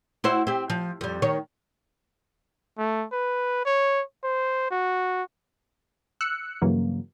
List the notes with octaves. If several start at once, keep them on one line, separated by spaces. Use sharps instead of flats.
E4 F#4 C5
C4 G4
F3
F2 G3
D#3 C#5
A3
B4
C#5
C5
F#4
E6 F#6 C#7
G2 C#3 E3 F#3 A#3